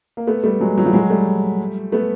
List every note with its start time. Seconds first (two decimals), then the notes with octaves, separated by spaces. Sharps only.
0.17 A#3
0.27 A3 B3
0.44 G3 A3
0.60 F#3 G#3
0.77 E3 F#3
0.85 F3 G3
0.93 F#3 G#3
1.10 G3 A3
1.92 A3 B3